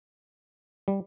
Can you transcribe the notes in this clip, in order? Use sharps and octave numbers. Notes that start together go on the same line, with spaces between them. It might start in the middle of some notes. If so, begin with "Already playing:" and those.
G3